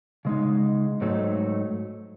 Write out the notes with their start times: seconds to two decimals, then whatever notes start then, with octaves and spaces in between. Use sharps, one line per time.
0.25 C#3 G#3 D#4
1.01 G#2 F#3 A3 D#4